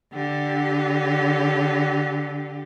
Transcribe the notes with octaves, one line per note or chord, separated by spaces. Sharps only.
D3 G4